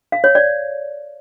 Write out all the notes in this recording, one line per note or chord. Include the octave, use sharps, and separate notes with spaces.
F5
C#5
D5